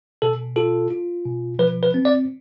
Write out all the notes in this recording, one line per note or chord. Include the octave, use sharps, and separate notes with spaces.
B2 A4
F4 A4
F4
B2
F3 B4
B4
C4
D5